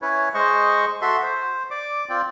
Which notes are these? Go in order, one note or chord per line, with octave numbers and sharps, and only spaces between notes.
C#4 E4 B4 C#5
G#3 C5 D#5 C#6
F#4 A4 E5 C6
C5
D5 D6
C4 F4 D5 G5